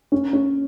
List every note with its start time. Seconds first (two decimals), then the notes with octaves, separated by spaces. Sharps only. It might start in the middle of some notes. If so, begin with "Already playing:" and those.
0.12 C#4
0.33 C#4